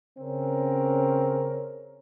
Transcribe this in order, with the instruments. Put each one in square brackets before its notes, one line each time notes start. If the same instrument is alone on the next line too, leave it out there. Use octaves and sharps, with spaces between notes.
[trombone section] C#3 C4 C#4 A#4